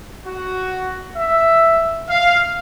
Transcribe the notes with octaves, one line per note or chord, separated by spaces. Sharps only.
F#4
E5
F5